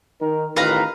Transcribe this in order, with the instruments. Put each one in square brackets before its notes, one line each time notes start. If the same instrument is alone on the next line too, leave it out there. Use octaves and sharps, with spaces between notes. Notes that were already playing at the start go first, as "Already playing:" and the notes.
[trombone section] D#3 D#4 A#4
[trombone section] A1 D#3 F4 [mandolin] B4 F5 A#5